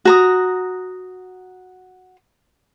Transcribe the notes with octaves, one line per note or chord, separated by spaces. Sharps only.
F#4 A#5 D#6